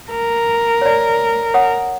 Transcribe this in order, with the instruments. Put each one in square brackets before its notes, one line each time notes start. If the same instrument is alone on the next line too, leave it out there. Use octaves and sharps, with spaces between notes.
[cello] A#4
[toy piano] C#5 D5
C#5 F#5 D#6